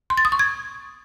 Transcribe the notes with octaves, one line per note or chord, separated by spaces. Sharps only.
C6
A6
D#6
C#6
G#6